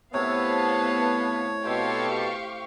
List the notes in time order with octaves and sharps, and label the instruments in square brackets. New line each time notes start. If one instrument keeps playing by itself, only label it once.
[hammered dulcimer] A2 C3 [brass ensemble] B3 [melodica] C#5 [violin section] F5 A5
[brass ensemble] B2 A4 [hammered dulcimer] C4 C5 [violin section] G4 F5 C#6